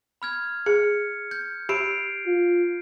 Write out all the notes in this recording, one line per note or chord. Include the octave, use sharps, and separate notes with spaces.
B5 F6 G#6
G#4 C#7
G6
G4 B5 C7 D7
F4